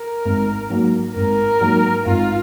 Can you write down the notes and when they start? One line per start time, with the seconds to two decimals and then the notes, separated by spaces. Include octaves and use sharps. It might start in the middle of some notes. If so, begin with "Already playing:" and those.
Already playing: A#4
0.25 G#1
0.70 G#2 F#3 A#3
1.15 G#1 A#4
1.61 G#2 F#3 A#3
2.06 G#1 F4